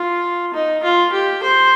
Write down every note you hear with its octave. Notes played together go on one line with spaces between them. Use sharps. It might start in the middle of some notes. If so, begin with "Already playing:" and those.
Already playing: F4
D#4
F4
G4
C5